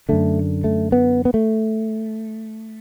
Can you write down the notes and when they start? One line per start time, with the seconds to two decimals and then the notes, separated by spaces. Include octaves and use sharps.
0.09 F#2 D3 A3
0.64 A3
0.92 B3
1.25 B3
1.34 A3